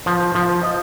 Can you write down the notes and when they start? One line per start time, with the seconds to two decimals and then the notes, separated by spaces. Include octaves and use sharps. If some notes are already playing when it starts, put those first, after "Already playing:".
0.06 F3
0.35 F3
0.63 D#5